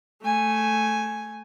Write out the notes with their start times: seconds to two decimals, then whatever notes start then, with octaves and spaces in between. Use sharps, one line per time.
0.22 A3 G#5